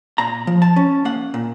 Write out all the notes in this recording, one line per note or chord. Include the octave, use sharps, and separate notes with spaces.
A#2 A#5
F3
A5
C#4
A#3 F#5
A#2